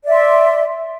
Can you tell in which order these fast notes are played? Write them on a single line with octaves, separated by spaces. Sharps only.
D5 E5 C6